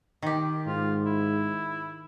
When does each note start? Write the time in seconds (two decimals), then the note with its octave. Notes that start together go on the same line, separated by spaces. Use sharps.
0.22 D#3 G4
0.67 G#2 F4
1.06 E4